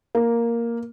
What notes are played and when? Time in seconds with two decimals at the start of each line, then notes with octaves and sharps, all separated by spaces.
0.15 A#3